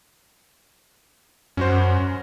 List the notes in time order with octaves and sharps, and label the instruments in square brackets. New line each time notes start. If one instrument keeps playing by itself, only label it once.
[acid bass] F#2 [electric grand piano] C#4 F#4 C5